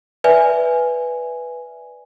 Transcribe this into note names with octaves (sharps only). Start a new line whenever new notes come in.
B4 D5 E5 G#5